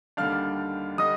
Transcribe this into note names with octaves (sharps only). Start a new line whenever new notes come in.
D#2 D3 G3 D4 F5 F6
D3 G3 D#5 D#6